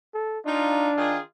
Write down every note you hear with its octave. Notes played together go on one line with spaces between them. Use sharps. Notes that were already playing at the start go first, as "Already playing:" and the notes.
A4
D4 D#4 F4
D#3 F4 G#4